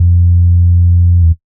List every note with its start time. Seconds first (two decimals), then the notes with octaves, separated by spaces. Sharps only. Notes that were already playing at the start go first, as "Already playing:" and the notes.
Already playing: F2
1.23 E2